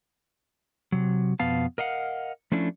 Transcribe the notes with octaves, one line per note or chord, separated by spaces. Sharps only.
C3 F#3
F2 B2 B3 F5 A5
A#4 D#5 F5 F#5
F3 A3 C#4 D4 E4